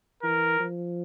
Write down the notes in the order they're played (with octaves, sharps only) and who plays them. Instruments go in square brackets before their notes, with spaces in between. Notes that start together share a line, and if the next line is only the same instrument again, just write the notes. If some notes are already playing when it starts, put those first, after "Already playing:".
[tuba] E3 [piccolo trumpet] A#4
[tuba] F3